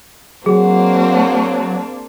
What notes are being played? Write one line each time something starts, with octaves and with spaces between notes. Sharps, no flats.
F#3 A#3 C4 D4 F#4 G#4